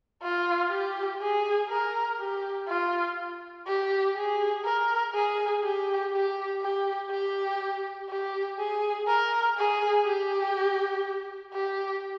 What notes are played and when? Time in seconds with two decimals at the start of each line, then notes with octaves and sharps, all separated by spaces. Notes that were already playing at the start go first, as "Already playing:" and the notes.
0.22 F4
0.71 G4
1.21 G#4
1.69 A#4
2.19 G4
2.68 F4
3.67 G4
4.16 G#4
4.64 A#4
5.14 G#4
5.63 G4
6.13 G4
6.61 G4
7.10 G4
8.09 G4
8.58 G#4
9.07 A#4
9.57 G#4
10.06 G4
11.53 G4